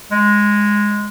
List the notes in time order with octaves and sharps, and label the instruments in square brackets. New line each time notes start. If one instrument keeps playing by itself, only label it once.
[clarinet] G#3